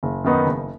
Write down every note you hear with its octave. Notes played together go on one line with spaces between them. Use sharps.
F#1
F#2 D#3 B3 D#4
F#1